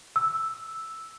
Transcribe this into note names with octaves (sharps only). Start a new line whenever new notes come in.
E6